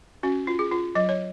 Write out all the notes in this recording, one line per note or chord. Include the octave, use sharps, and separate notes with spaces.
C#4 F#4
F4
G#4
F4
F#3 D#5
C#5